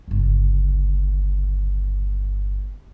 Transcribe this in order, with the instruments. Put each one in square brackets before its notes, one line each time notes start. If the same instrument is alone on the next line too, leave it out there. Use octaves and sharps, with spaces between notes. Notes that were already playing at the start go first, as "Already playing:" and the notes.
[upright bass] G1 C#2